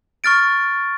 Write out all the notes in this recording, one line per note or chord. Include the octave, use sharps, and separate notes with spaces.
C#6 F6 A6 D7